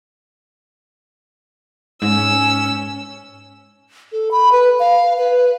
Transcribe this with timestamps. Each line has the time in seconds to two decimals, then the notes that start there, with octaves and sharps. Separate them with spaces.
2.02 G#2 C#4 E6
4.12 A4
4.31 B5
4.52 B4
4.80 F5
5.18 B4